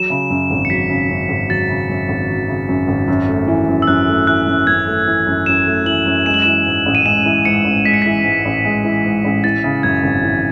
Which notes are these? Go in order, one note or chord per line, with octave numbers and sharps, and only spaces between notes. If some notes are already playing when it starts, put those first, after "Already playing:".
Already playing: F#3 E7
C#3
F#2
G#1
C#7
F#3 B6
C#3
F#2
G#1
F#3 A6
C#3
F#2
G#1
F#3
C#3
F#2
G#1
F#2
A3
E3
F#2
E6
F#2 F#6
A3
E3 F#6
F#2
F#2 G#6
A3
E3
F#2
F#2 E7
A3
E3 F#7
F#2
G#3 E7
F#7
E3 E7
G#2
A1
D#7
G#3 E7
E3
G#2 C#7
A1
G#3 B6
C#7
E3 B6
G#2
A1
G#3
E3
G#2
A1
E3 A6
C#3
F#2 G#6
G#1
E3